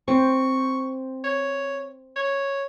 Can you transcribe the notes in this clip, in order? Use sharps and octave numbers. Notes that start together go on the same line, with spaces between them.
C4 C5 C#6
C#5
C#5